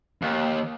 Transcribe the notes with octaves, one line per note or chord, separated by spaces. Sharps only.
D#2